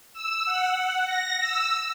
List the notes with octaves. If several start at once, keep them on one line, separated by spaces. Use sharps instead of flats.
E6
F#5
A#6
E6